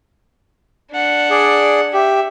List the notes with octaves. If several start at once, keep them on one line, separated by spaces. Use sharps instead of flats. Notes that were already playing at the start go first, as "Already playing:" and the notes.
D4 F#5
G#4 D5
G4 E5